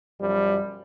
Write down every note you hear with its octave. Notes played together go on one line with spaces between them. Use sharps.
B1 F#2 F3 G3